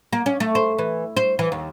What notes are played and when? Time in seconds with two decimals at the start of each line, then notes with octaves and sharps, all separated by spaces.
0.13 A#3
0.26 C#4
0.40 A3
0.55 C5
0.79 E3
1.17 C5
1.39 E3
1.52 D#2